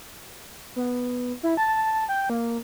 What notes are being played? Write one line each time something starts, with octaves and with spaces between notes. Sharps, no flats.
B3
E4
A5
G5
A#3